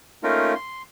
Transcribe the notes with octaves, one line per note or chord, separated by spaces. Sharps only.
A3 A#3 C#4 D#4 F4 A#4
C6